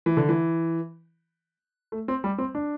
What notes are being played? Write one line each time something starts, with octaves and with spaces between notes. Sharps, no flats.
E3
D3
E3
A3
C4
G3
C4
D4